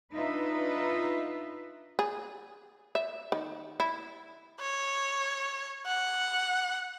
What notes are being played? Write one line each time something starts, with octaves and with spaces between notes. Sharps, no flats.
D4 D#4 F4 B4 E5
G#4
E5
D#3
E4
C#5
F#5